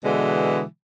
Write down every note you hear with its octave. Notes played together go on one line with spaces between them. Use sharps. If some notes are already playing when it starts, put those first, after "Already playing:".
B2 D3 E3 G#3